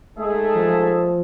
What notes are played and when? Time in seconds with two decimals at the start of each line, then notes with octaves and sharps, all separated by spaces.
0.17 G#2 G#3 A3 G#4 E5 A5
0.55 F3